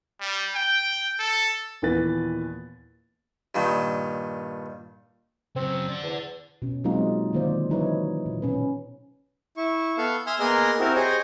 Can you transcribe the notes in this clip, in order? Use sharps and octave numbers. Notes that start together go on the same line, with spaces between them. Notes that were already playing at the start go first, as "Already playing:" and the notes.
G3
G5
A4
D#2 A#2 E3 B3 B4 A6
G2 A#2 D#3
C#3 F#3 C4
D5 F#5
E2
B2 C#4
F#3 G#3 A#3 C4 D#4 F4
D3 D#3 A#3 F4 C5 D5
E3 F#3 D#4 E4 B4 C#5
A#2
B2 C#4 B4
E4 C#6
B3 A4 F5 C#6
E5 G#5 C6 D#6 F6
A#3 B3 G#4 A#4 D#5 C6
C4 E4 F#4 G4 A#4
G4 G#4 C5 C#5 D#5